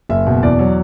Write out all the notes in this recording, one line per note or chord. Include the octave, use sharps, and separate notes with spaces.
F#1 E5
B2
E2 D5
F#3